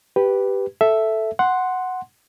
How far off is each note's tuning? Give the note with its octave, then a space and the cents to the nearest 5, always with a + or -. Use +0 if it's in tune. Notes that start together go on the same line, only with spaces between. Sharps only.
G4 +0 B4 +0
A4 +0 E5 +0
F#5 +0 C6 +0